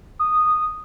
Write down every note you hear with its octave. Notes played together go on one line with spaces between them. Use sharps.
D#6